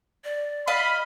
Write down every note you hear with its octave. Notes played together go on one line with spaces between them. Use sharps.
D5
D#5 F5 B5